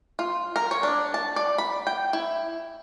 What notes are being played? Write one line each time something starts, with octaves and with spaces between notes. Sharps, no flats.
F4
A#4
C#5
D4
A5
D5
B5
G5
E4